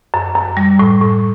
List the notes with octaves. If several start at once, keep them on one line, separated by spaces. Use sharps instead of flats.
F#2
F#2
G3
A2
A2